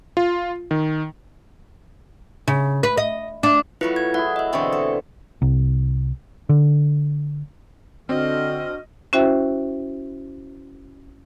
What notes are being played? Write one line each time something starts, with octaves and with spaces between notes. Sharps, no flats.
F4
D#3
C#3
B4
D#5
D4
F#3 A3 B3 E4 F4 B4
G#6
E4 G#4 F#5
D#5 E5
B2 D3 E3 C4 E5 C#6
A4
C2
D3
D3 C4 D4 F#4 D#5 F6
C#4 E4 F#4 C5 E5 G5